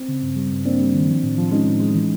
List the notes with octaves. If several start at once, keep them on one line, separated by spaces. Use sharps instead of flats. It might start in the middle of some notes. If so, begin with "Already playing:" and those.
Already playing: C4
C#3
G2
G3
G2
A#3 C4 D4
G3
D#3
F3
A2
F3
G#3 C#4 D#4
A2
G#3
E3